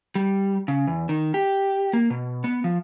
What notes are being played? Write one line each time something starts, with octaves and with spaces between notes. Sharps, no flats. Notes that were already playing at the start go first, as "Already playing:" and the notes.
G3
C#3
E2
D#3
G4
A#3
B2
B3
F3